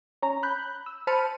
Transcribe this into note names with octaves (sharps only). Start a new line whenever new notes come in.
C#4 A#5
B5 F#6 G6
E6
C5 A5 B5 F6 C#7 D#7